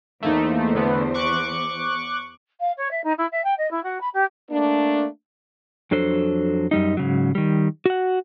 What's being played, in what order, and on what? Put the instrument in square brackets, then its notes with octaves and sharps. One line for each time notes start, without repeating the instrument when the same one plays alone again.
[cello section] E2 C5 [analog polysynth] A3 A#3 D#4
[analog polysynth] D3 A3 B3
C#6 D6 F#6
[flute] F5
C#5
E5
D#4
E4
E5
G5
D#5
E4
F#4
B5
G4
[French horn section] A3 A#3 D4
[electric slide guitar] F2 F#3 D4 A4 C5
F#2 G3 D#4
G#2 C#3 F#3
D#3 G3
F#4 F#5